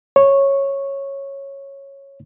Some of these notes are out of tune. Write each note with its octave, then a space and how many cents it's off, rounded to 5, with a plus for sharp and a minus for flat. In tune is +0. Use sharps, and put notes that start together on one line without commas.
C#5 -10